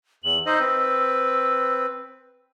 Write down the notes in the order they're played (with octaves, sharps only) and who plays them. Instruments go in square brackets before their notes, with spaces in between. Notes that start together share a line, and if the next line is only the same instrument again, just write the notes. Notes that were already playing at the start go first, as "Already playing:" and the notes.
[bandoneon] E2 [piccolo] F#7
[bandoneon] D#4 C5 D#5 [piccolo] E6
[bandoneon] C4 B4